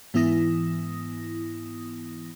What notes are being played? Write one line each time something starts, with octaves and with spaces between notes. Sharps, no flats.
G#2 E3 B3 E4 D#6 A#6